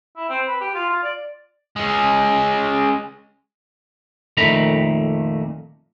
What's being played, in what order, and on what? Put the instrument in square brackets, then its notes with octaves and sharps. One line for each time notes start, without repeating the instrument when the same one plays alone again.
[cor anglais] E4
C4
B4
G4
F4
F4
D5
[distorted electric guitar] G#3 C#4
[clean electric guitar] F2 A#2 D#3 A3 A#5 B5